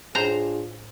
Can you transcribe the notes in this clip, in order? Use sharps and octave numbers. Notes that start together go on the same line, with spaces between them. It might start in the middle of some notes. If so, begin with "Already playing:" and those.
A2 D4 F4 G#4 C5 A#5